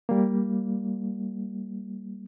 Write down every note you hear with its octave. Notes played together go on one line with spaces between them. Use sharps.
G3 A#3